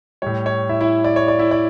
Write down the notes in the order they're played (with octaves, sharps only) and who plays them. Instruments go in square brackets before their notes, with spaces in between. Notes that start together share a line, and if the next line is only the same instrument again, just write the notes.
[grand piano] A2 G3 C#5
C#5
E4 E5
E4 E5
D5
C#5
D5
E4 E5
D5